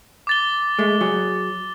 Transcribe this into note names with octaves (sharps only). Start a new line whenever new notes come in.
D6 A6 G7
G#3 A3
F#3 G#4